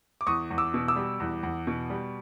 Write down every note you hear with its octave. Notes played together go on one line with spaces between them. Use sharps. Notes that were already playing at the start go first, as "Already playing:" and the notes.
D6
E2 C#6 D#6
E2
D6 E6
B2
D6 E6
G3
E2
E2
B2
G3